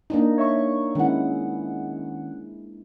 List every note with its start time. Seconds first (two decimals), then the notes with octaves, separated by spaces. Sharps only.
0.10 A#3 D4 D#4
0.38 C#5 E5 C#6
0.95 D#3 G#3 C#4 E4 F#5